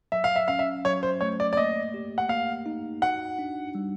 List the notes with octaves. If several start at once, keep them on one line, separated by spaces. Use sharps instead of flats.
F#3 E5
F5
E5
C#4 F5
E5
F#3 C#5
C5
A3 C#5
D5
D5
A#3 D#5
G4
F#5
A#3 F5
D#4
F#4 F#5
D4
G3